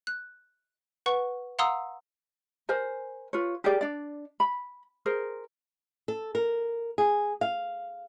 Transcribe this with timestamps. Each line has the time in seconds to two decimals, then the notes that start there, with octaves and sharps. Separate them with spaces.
0.07 F#6
1.06 B4 F#5 C#6
1.59 F5 F#5 A#5 C6 D#6 E6
2.69 A#4 C5 G#5
3.33 F4 B4 C#5
3.64 G4 G#4 A#4 D5
3.81 D4 D5
4.40 B5
5.06 G#4 A#4 C5
6.08 A4
6.35 A#4
6.98 G#4
7.41 F5